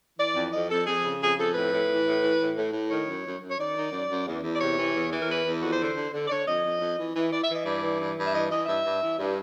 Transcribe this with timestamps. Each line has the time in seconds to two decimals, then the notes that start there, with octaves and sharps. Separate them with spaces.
0.17 E3 D5
0.35 F2
0.51 F2 D#5
0.68 F2 A4
0.85 F2 G#4
1.03 C#3
1.20 F2 G#4
1.36 F2 A4
1.53 A2 B4
1.70 A2
1.88 E3
2.04 A2
2.21 E3
2.39 A2
2.55 A2
2.72 A2
2.89 D#3 C#5
3.06 F#2
3.24 F#2
3.40 F#2
3.49 C#5
3.57 D#3 D5
3.74 D#3
3.91 F#2
4.08 F#2
4.25 E2
4.41 E2
4.52 D5
4.59 C3 C#5
4.76 E3
4.93 E2
5.10 E3
5.20 A#4
5.27 E2 B4
5.44 E2
5.60 F2 F#4
5.72 C5
5.78 D3
5.83 C5
5.95 D3
6.12 D3
6.25 D5
6.29 D3 C#5
6.45 F2 D#5
6.62 F2
6.79 F2
6.97 E3
7.14 E3
7.30 E3 D5
7.42 E5
7.48 E3 D#5
7.64 G2 D5
7.81 E3
7.99 G2
8.15 G2
8.23 E5
8.32 E3 D#5
8.49 E3 D#5
8.66 G2 E5
8.83 G2
9.00 E3
9.17 G2